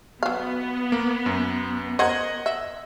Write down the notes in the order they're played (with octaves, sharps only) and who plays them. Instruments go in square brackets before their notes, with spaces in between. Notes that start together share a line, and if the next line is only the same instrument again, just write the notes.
[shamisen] F#3 F5 [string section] B3
[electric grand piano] A#3
F#2
[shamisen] A#4 C5 [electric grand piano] D#5 F#5 G#6
[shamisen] E5